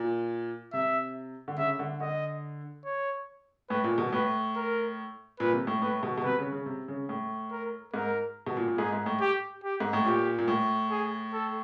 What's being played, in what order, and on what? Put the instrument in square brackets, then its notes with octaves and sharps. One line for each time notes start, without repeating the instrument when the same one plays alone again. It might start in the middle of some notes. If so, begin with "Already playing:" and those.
Already playing: [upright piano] A#2
[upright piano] C3 [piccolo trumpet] E5
[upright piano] D3
[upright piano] C#3 [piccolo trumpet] E5
[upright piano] D3
[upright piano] D3 [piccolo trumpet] D#5
[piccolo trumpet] C#5
[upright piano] A2 [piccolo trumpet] B4
[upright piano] A#2
B2
[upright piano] A2 [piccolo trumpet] B4
[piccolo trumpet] A#4
[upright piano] A#2 [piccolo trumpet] B4
[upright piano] C3
A2
[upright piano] A2 [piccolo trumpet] B4
[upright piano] B2
B2
[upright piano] C3 [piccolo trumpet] B4
[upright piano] C#3
C#3
C3
C#3
A2
[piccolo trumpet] A#4
[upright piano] G#2 [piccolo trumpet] A#4
[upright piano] B2
A#2
A#2
[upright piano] G#2 [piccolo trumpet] G#4
[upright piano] G#2
A2
[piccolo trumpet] G4
G4
[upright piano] G#2
A2
[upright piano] A#2 [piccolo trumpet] G4
[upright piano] A#2
A2
[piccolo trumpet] G#4
A4